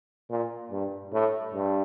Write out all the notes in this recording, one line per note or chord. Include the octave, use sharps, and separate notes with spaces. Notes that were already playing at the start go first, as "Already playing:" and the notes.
A#2
G2
A2
G2